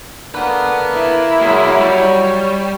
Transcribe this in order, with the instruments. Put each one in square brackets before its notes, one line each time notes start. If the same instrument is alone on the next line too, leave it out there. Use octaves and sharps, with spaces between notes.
[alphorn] D3 [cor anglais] A#3 [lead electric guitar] B4 F#5
[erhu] E4
[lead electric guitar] B2 G#3 [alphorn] F#3 [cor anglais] A#3
[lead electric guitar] G3 [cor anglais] C#5